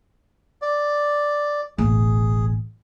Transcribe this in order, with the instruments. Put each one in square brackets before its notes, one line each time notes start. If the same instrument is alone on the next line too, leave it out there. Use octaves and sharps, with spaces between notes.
[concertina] D5
[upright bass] E1 A1 [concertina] G#4